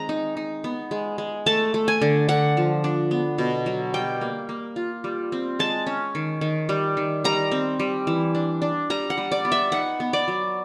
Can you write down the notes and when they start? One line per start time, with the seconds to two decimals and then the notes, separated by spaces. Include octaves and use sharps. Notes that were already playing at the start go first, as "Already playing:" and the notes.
Already playing: D#3 G#3 C4 A#5
0.09 D#4
0.37 D#4
0.64 B3
0.91 G#3
1.18 G#3
1.46 A3 A5
1.74 A3
1.88 G#5
2.01 D3
2.29 D3 F#5
2.57 F3
2.84 D4
3.11 B3
3.38 B2
3.66 F#3
3.94 G3 G5
4.21 A#3
4.49 A#3
4.76 F4
5.04 G3
5.32 C4
5.59 G#3 A5
5.87 C#4
6.15 D#3
6.41 D#3
6.69 G3
6.97 D#3
7.24 G3 A#5
7.51 C4
7.80 G3
8.07 E3
8.35 D4
8.62 D4
8.90 G3 A#5
9.10 F#5
9.17 G3
9.32 D5
9.45 B3
9.52 E5
9.72 D#4 F#5
10.00 B3
10.13 D5
10.28 F#3